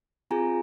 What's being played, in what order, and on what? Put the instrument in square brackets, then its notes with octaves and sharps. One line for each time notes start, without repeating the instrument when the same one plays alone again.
[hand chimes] C4 F4 G#4 G#5 A#5